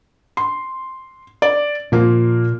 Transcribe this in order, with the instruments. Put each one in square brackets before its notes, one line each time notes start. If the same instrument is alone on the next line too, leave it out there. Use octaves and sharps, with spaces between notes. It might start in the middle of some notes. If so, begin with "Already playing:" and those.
[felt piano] C6
D5
[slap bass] A#2 [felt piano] F3 A#3